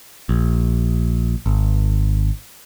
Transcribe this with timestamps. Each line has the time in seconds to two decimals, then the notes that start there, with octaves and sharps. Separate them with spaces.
0.29 A#1
1.46 G#1